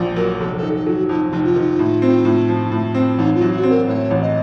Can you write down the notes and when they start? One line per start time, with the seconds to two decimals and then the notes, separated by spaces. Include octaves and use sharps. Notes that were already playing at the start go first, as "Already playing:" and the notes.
Already playing: A#1 A#2
0.16 F#3 A#4
0.39 F1 A4
0.57 A4
0.63 D#3
0.75 A4
0.86 F#3 F4
0.92 F#4
1.09 F2 D#4
1.31 F1 D#4
1.44 F4
1.56 D#3
1.79 A2
2.02 C4
2.25 A2
2.48 F3
2.72 A2
2.95 C4
3.18 A1 D#4
3.35 F4
3.41 F#3
3.52 F#4
3.63 C4
3.69 A#4
3.87 A2 C#5
4.10 A1
4.21 D#5